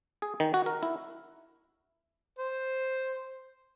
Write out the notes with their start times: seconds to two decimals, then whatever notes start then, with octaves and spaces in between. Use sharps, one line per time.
0.22 G#4
0.40 D#3
0.54 F#4
0.66 A#4
0.83 E4
2.39 C5